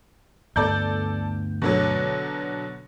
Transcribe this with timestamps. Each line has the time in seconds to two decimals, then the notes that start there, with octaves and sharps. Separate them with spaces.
0.56 D2 G2 B3 A4 D5 G6
1.62 B2 D3 F#3